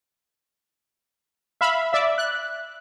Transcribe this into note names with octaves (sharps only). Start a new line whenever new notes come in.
E5 F5 B5
D5 E5
F#6